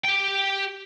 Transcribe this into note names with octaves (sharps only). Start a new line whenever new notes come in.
G4 G5